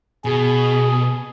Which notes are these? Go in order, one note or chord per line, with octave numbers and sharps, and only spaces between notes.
B2 G#4